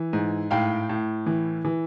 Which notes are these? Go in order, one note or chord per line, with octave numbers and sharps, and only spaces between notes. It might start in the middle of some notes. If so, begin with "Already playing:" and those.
Already playing: E3
G#2
A2 F5 G5
A2
E3
E3